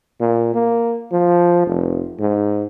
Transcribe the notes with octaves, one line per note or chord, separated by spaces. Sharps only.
A#2
A#3
F3
F1
G#2